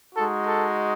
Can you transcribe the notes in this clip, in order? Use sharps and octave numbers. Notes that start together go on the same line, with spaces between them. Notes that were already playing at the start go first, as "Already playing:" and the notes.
G#3 D#4 F#4 A4
A4